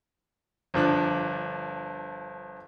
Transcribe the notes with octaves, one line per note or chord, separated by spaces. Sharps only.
G1 F3 D4 F#6